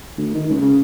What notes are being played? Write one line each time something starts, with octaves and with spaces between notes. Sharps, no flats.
D2
D#3
C#2
C#3